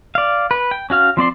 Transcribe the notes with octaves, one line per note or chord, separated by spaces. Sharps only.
D5 F5
B4
G5
C#4 F#4 F5 F6
F3 C4 D5 C6